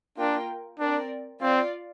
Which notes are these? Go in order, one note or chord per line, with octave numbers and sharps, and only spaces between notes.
A#3 D4 F4 A#4 G5
C4 D4 A#4 D5
C4 F4 D5 F5